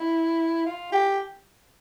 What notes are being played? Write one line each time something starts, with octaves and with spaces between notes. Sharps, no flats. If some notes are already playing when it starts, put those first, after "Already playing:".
Already playing: E4
F4
G4